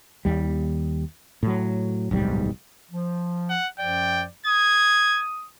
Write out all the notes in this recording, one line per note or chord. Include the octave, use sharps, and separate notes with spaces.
D#2 G3
A2 F#3
D1 B1 G#2 G3
F3
F#5
F#2 F3 D5 G5
D#6 G#6